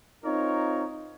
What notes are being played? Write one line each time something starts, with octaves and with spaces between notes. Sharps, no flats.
C4 D#4 F4 A#4 C#5